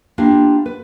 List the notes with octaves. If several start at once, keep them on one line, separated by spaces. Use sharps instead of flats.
A#3 B3 D4 E4 F4 G4
B4